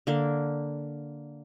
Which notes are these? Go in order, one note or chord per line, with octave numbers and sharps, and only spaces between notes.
D3 A#3